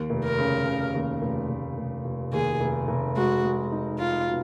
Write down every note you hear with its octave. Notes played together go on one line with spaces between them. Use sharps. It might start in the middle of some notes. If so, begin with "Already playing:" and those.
Already playing: D#2
F1
A#4
C#3
C#3
D#2
F1
F1
F1
F1
D#2 G#4
F1
F1
G#3 F#4
G#3
D#4
D#4 F4
B2